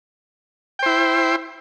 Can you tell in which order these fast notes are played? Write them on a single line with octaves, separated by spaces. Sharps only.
G5 C5 E4